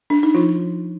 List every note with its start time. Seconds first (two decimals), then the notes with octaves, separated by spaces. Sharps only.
0.10 D4
0.23 D#4
0.35 F3 F4